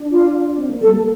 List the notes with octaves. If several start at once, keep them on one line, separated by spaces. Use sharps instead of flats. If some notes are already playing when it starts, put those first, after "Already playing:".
Already playing: D4
F4
C4
A#3
G3 A4
A#3